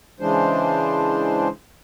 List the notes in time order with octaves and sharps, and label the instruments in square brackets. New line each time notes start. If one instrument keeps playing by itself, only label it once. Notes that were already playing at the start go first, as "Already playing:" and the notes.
[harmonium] C#3 E3 G#3 D4 C5